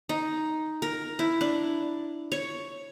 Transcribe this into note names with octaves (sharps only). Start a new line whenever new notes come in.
D#4
A#4
E4
D4
C#5